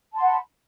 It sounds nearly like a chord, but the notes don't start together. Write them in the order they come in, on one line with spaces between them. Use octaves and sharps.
A5 C6 F#5 B5